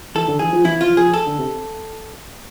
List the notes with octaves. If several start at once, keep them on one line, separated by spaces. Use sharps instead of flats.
E3 A4
D3
E3 G#4
F3
E3 E4
F4
F3
G#4
A4
D3
C3